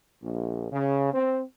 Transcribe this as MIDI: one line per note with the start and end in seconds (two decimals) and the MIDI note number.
0.23 0.69 34
0.71 1.12 49
1.13 1.40 60